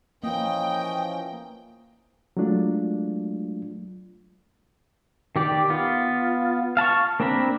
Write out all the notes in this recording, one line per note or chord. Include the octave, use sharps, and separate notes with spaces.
E3 F3 A#3 C#4 D#5 G5
F#3 G#3 A3 D4 F4
D#3 G4 D5
B3 F4
F5 A5 B5 C#6
A#3 C4 D4 A#4 B5